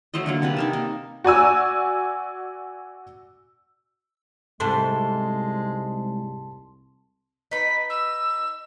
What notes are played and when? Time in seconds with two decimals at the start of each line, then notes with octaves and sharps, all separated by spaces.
0.14 F#3 A3 C5 D#5
0.26 D3 F#3 A#3
0.42 C3 A#3 D4 B4
0.57 D#4 A#4 A5
0.73 A#3
1.24 F#4 D5 G#5 E6
4.60 C2 G#2 G#3 A3 A5 C6
7.51 D#4 B4 B6
7.89 E6